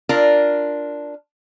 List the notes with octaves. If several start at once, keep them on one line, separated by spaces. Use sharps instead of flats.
D4 F4 A#4